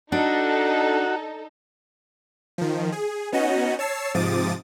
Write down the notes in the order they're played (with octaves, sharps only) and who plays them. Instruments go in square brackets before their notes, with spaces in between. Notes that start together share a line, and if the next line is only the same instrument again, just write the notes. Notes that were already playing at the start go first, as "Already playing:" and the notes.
[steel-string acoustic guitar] D4 [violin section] D#4 A4 [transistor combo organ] F#4
[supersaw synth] D#3 F3
G#4
B3 C#4 D#4 F#4 D#5
C#5 A5 E6 C7
G#2 C3 F3 D6 D#6 A6